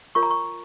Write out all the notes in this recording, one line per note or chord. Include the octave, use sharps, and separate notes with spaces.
F4 A#4 C#5 C#6
A#5
C#6